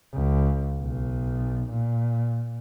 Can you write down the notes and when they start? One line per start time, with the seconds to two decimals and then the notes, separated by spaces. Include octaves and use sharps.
0.13 C#2
0.81 B1
1.70 A#2